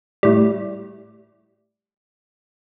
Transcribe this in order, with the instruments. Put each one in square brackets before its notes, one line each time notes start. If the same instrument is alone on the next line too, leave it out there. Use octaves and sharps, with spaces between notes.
[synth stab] A2 G3